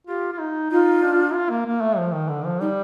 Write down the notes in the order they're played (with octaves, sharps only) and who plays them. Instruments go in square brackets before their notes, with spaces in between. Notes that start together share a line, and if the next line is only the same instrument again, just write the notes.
[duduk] F4 [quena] G4
[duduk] F4
D#4
[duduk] D#4 [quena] F4
[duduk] D4
F4
A#3
A#3
A3
F3
D#3
D3
F3
[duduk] G3 [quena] D#4